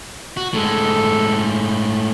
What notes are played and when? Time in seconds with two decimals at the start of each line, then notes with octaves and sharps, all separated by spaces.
0.37 F#4
0.54 A2 G#3 A4